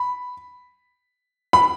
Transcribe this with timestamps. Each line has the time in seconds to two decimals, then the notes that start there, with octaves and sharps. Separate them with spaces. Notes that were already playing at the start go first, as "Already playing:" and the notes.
Already playing: B5
1.53 B5